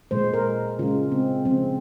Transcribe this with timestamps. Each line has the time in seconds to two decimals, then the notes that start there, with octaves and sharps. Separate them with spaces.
0.11 A#2 G#3 C5
0.34 A#4
0.79 C#3 G#3 F4
1.12 C4
1.45 C#3 F3 G#3 C4